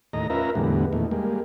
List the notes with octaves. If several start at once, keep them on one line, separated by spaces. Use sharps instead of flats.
D#2 A2 D#5 A#5
C#4 F4 A#4 B4 E5 A#5
E2 A2 D3 G3 G#3 B3
E2 A#2 D#3 A3
G3 G#3 A#3